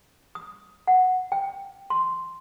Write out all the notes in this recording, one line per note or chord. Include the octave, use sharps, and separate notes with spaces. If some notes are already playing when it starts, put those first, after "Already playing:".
D#6
F#5
G5
C6